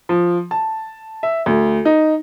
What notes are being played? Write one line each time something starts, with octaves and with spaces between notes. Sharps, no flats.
F3
A5
E5
D2
D#4